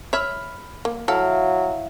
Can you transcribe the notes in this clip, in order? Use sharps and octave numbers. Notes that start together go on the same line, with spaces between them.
C#5 E5 B5 F6
A#3
F#3 E4 A4 F5